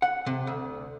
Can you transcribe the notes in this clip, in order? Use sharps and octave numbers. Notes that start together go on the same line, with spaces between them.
F#5
C3
D2